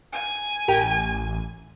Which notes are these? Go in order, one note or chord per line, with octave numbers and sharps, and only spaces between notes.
G#5
A1 G4 A#4 G5